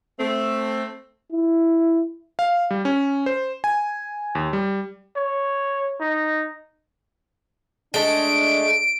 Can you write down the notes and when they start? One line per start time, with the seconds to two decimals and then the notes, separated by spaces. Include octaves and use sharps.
0.19 A3 C4
1.32 E4
2.39 F5
2.71 G3
2.85 C#4
3.26 C5
3.64 G#5
4.35 D#2
4.53 G3
5.16 C#5
6.00 D#4
7.94 G#3 A3 D4 D7